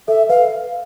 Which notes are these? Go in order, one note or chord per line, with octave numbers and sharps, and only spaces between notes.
A4 E5
B4 F5